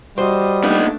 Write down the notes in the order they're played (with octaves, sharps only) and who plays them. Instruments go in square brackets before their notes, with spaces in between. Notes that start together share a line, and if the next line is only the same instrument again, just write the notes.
[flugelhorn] G3 [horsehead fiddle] F#4 D#5 [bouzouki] C5
[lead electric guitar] A#2 D#4 [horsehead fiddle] A3 D4 [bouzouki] B3